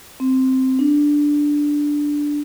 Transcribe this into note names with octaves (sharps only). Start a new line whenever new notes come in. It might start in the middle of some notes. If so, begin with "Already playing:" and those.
C4
D4